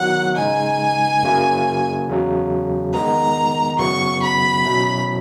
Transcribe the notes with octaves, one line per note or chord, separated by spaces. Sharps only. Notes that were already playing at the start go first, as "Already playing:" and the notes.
Already playing: D#3 F#3 B3 E4 F#5
C#3 G#3 D#4 G#5
F#2 C#3 F#3 A#3 E4
E2 C#3 F#3
D#3 G#3 B3 A#5
F#2 C#3 F#3 B3 E4 C#6
B5
B2 F#3 C#4 E4